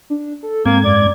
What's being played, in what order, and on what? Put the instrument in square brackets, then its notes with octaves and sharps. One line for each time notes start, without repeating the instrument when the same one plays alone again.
[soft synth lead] D4
A4
[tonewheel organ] G#2 G#6 [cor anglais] A#3 [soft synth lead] C4
[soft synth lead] F#2 [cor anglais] D5